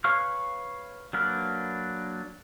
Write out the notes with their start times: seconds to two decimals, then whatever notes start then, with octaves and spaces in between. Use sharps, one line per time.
0.04 B4 C#5 F5 C#6 F6
1.13 F#3 A#3 D4 B4 F6